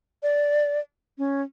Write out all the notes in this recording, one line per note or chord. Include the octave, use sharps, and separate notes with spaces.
D5
C#4